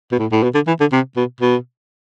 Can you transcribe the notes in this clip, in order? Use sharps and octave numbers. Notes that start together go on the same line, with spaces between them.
B2
A2
A2
B2
D3
E3
D3
C3
B2
B2